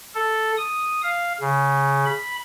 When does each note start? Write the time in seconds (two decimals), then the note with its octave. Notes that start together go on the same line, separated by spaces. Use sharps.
0.15 A4
0.57 D#6
1.03 F5
1.41 C#3
2.06 B5